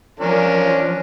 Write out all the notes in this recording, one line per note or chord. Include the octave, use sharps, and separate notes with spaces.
F3 C#4 D4 A#4